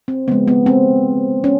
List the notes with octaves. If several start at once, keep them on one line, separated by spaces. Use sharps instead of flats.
C4
C#3 F3 G#3 B3
B3
C4
C#4